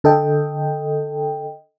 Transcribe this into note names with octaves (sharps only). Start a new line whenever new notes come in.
D3 A4 D#5 G5